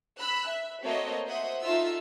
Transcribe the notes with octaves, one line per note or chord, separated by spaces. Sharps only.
B5 E6 F#6
E5
A3 A#3 C4 F#4 C#5 D#5
C5 E5 F#5 D#6
A3 D#4 F4 E5 E6 C7